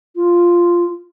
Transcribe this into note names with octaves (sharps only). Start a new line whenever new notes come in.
F4